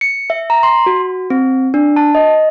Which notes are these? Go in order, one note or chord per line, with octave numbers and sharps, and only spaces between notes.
C#7
E5
A#5
C6
F#4
C4
D4
A5
D#5